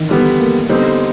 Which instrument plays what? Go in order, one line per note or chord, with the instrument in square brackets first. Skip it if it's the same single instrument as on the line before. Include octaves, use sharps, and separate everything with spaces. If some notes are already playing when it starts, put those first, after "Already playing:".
Already playing: [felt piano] D#3 E3
[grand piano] D3 G3 B3
[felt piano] A#3
[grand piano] D3 G3 C4 D#4 [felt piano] B3